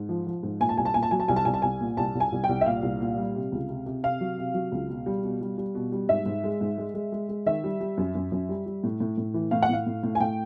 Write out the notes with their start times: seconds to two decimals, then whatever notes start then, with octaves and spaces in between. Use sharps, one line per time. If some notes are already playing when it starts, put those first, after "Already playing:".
Already playing: G#2
0.09 F3
0.27 F3
0.43 G#2
0.60 A#2 G#5
0.69 A5
0.77 C2 G#5
0.85 A5
0.94 A#2 G#5
1.03 A5
1.11 F#3 G#5
1.20 A5
1.28 C2 G#5
1.36 A5
1.45 C2 G#5
1.54 A5
1.62 C2 G#5
1.81 A#2
1.97 C2 A5
2.15 C2
2.20 G#5
2.32 C2
2.44 G5
2.49 C2
2.61 E5
2.66 A#2 F5
2.83 C2
3.01 A#2
3.18 G3
3.35 C3
3.52 C#2
3.69 C3
3.86 C3
4.03 C3 F5
4.21 F#3
4.38 C3
4.54 F#3
4.72 C#2
4.89 B2
5.06 G3
5.24 B2
5.41 G3
5.58 G3
5.75 B2
5.92 G3
6.09 G#2 E5
6.26 G#2
6.44 G#3
6.61 G#2
6.78 G#3
6.94 G#3
7.12 G#3
7.29 G#3
7.46 D#3 E5
7.64 G3
7.80 G3
7.97 F#2
8.15 F#2
8.32 F#2
8.49 G3
8.66 G3
8.84 A2
9.00 A2
9.18 A2
9.34 E3
9.51 A2 F5
9.62 F#5
9.69 A2 F5
9.86 A2
10.03 A2
10.15 G#5
10.20 A2 G5